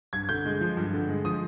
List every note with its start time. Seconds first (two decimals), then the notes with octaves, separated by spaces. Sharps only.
0.13 G2 G#6
0.29 D3 G6
0.45 G#3
0.61 F3
0.77 G2
0.93 D3
1.09 G#3
1.25 F3 D#6